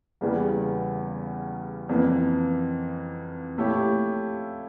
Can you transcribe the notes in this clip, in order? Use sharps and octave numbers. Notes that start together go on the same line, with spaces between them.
E2 C#3 E3 G3 A#3
F2 E3 A#3
A#2 A3 E4 G4 C#5